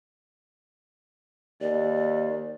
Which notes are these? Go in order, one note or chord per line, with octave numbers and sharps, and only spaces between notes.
D#2 D5